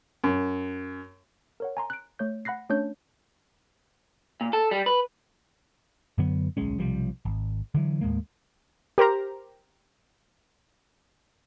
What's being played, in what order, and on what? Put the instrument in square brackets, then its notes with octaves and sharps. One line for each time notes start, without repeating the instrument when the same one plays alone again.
[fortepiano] F#2
[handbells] A#4 C#5 F#5
G#5 A#5 C6
F#6 D7
A3 C#5 G6
F#5 B5 F#6 A#6 C7
A3 C#4 D4 C#5 A5 G6
[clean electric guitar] A#2
A4
G3
B4
[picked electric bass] F#2 D3 F#3 B3
D1 B1 G#3 C#4
B1 C3 F3 G3
G#1
D3 E3 F#3
D#2 A2 G#3 A#3
[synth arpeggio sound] G4 A#4 C5 A#5